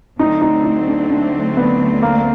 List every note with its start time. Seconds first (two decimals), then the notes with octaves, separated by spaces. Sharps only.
0.19 D2 D3 F#3 A3 C4 D#4
0.42 D#4
0.64 D#4
0.88 D4
1.10 D4
1.57 B3
2.03 A#3